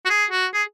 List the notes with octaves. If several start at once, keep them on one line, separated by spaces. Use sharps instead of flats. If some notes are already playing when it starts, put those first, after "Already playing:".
F#4
G#4
F#4
G#4